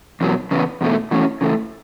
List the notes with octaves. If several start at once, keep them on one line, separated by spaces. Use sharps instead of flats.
E2 B2 F#3
E2 C#3 B3
E2 B2 A3
E2 E3 A3 C#4 F#4
C#3 E3 A3